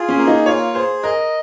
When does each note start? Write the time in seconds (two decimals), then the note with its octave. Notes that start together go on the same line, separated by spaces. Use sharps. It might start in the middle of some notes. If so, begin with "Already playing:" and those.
Already playing: F4 G#4
0.09 C#4
0.18 A#3
0.27 D#4
0.46 F4 C#5
0.74 G#4 C5
1.03 A#4 D#5